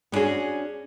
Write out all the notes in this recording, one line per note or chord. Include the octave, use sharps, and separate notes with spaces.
B3 C#4 D4 F#4 G#4